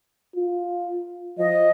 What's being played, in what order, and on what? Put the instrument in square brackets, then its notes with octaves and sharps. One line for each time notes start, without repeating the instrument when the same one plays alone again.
[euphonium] F4
[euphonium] F3 [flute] D#5